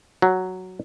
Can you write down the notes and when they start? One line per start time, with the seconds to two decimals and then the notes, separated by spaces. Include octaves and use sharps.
0.22 F#3